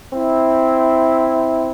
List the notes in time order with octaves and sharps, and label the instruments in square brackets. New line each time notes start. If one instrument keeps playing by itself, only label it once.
[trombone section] C4 E4